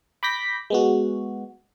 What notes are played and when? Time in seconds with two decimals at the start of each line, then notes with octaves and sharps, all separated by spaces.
0.23 B5 D6 G6 A#6 B6
0.70 G#3 B3 F#4